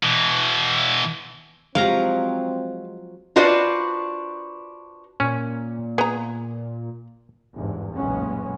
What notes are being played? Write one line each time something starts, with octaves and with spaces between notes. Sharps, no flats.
B2 E3
F3 F#3 G#3 C4 G4 F5 A#5
D4 F4 F#4 B4 C5 D5
A#2 C#4
B3 G#4 A#5
G1 E2 G#2
F#1 B1 A#2 G#3 B3 C#4